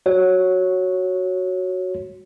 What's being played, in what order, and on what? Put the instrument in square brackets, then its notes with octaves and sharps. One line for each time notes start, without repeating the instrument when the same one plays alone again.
[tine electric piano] F#4 C#5